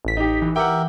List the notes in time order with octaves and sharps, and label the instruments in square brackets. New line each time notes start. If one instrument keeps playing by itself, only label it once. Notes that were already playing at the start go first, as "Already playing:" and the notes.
[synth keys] A1 B6
[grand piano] D#4 G4
[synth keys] E3
[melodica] G4 A#4 E5 [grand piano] F#5 G5